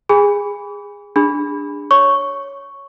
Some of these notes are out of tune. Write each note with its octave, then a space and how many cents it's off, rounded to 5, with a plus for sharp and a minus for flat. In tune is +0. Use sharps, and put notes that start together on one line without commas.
G#4 -20 G#5 -30 B5 +0
D4 +0 G#4 -35 B5 +0
C#5 +0 C#6 +0